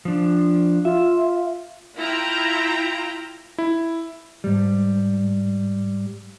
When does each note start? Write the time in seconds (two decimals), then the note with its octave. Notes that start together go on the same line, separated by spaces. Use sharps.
0.05 F3 D4
0.85 F4 E5
1.97 E4 F4 G5 A#5
3.58 E4
4.44 G#2 G3